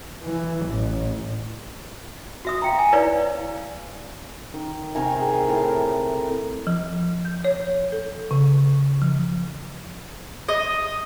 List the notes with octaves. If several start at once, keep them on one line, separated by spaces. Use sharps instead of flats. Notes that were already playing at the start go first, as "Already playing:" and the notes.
E3
A1
F#4 E5 D#6
F5 G5 A#5
G#5
D#4 E4 B4 C#5 D5 F5
D#3
C3 D#3 A#4 G#5
G#4
A2 A#4
F3
G6
C#5
A4
C#3
F3
D#5